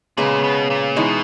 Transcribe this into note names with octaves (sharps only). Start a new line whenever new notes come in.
A#2 C#3 G#3 B3
B2
A#2
B2 E3 G#3 B3 D#4